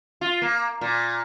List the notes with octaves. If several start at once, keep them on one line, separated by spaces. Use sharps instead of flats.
F4
A#3
A#2